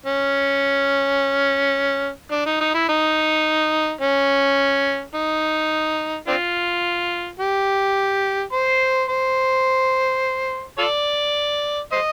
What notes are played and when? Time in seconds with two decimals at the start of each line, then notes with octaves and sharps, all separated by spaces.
0.06 C#4
2.31 D4
2.46 D#4
2.61 D#4
2.74 E4
2.89 D#4
4.01 C#4
5.15 D#4
6.27 C4 D4 F4
7.40 G4
8.53 C5
9.09 C5
10.78 F4 A4 D5
11.92 C5 D#5